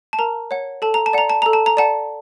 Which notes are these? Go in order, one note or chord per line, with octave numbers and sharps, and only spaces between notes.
A5
A#4 A#5
C#5 F#5
A4 A5
A#5
A5
D5 F#5 A#5
A5
A4 A#5
A5
A#5
D5 F#5 A5